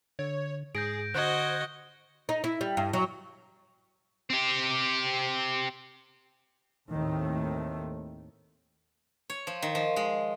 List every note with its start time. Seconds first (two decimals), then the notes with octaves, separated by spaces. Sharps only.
0.19 D3 C#5
0.75 G#2 G#4 G6 A#6 D7
1.15 D3 F#4 C5 D#5 F#6 G#6
2.29 D#4
2.44 E4
2.61 G3
2.77 G2
2.93 F#3
4.30 C4 G4
6.90 D#2 A2 D#3 A3 C4
9.30 C#5
9.47 F3
9.62 D#3
9.75 F3
9.96 G#3